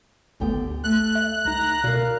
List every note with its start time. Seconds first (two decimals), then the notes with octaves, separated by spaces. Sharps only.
0.40 G#1 D2 D3 B3 G4 G5
0.84 A3 F#6
1.15 E5
1.45 C#2 D#4 A#5
1.84 B2 A#4 D5 F5